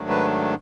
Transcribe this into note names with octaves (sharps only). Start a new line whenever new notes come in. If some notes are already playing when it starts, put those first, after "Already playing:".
Already playing: G#2 D#3 F#3 A3 D4
B4